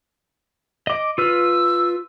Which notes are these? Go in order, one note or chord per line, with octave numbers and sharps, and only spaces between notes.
D#5 D6
F4 B4 E6 F6